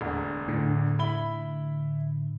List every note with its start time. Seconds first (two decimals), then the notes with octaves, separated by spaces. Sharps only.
0.01 E1 D2
0.48 A2 D3
0.99 E4 B5 G7